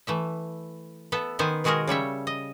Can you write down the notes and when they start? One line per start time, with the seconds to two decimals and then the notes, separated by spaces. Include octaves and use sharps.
0.07 E3 A3 E5
1.12 B3 A4 E5
1.39 D#3 B3 C5 G#5
1.64 B2 D#3 G#3 F#4 G#4 A#4
1.87 C#3 G3 C#5 E5
2.27 D#5